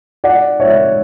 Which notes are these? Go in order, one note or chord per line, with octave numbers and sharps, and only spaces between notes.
D5 F#5
C#5 E5